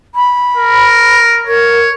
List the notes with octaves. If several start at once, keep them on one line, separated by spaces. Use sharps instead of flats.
B5
A#4
A#4 C#5